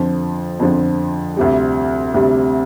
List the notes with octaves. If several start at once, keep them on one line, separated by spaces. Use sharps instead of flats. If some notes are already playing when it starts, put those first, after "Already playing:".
Already playing: F2 D3 F3
F2 D3 F3
D2 C3 G3
D2 C3 G3